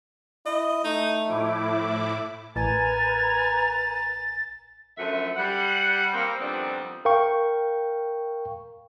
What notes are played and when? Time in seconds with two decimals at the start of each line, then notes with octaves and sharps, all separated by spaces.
0.46 E4 D#5
0.84 A3 D#4
1.29 A2 F3 E4 D6
2.56 A1 A#4 B4 G#5 A#5 A6
4.98 F#2 D3 F3 A3 E5 F#5
5.35 G3 F#5
6.14 A#3 C4
6.39 F2 D#3 G3 B3 C4 D4
7.05 A#4 F5 G5 C#6